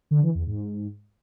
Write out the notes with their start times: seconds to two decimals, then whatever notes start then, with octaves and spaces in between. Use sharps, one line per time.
0.11 D3
0.23 E3
0.35 E2
0.47 G#2